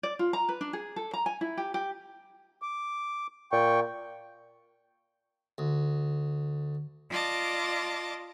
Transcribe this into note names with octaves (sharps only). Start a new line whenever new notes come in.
D5
F4
A#5
B4
D4
G#4
A4
A#5
G#5
E4
G4
G4
D6
A#2 G5 C#6
D2
F4 D5 D#5 A5 D6